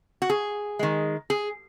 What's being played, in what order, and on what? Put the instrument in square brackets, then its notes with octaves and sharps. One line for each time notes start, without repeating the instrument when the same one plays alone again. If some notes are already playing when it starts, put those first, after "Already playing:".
[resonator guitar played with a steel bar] F#4
G#4
D#3 G#3
G#4